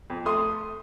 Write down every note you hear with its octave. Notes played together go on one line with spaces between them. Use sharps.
F2
A3 C6 D#6